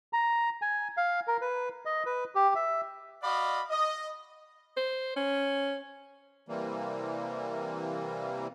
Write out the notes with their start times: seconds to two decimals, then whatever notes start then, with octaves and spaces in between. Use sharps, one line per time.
0.13 A#5
0.62 G#5
0.97 F5
1.27 A#4
1.41 B4
1.85 D#5
2.06 B4
2.35 G4
2.55 E5
3.23 F#4 D5 D#5 F5 B5
3.70 D#5
4.77 C5
5.16 C#4
6.49 C3 E3 G3 A#3